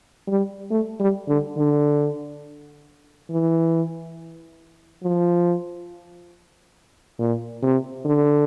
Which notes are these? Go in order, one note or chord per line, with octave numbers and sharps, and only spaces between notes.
G3
A3
G3
D3
D3
E3
F3
A#2
C3
D3